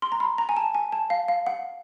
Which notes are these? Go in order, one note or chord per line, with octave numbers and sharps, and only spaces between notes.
C6
A#5
B5
A#5
G#5
A5
G#5
A5
F5
F5
F#5